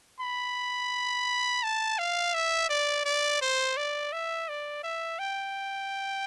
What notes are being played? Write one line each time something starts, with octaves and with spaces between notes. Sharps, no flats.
B5
A5
F5
E5
D5
D5
C5
D5
E5
D5
E5
G5